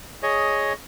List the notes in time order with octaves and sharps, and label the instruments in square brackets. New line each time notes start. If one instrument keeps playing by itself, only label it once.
[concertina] G#4 C#5 D#5